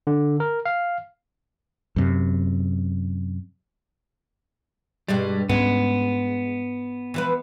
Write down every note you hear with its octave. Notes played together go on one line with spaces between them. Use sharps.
D3
A#4
F5
F#2 C3
G2 B2 G3 G#3
G#2 G#3 B3 C#4
E3 F3 B4